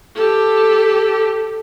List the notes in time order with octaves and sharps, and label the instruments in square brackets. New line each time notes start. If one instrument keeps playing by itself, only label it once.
[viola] G4 A4